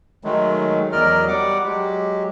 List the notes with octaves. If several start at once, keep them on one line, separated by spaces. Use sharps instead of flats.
D#3 F#3 G#3 A3
E2 F#3 A#4 D5 D#5 F6
G3 D5 F#5 D6
F#3 G#3 G4